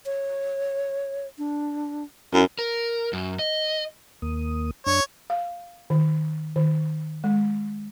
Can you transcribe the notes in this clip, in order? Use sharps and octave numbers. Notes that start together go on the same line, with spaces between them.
C#5
D4
F#2 E4
A#4
F#2
D#5
D#2 A#3 D#6
F#2 D4 C#5
F5
D#3
D#3
G#3